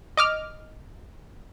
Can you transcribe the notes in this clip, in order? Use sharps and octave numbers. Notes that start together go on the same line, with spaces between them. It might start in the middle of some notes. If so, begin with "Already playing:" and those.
D#5 D6 F6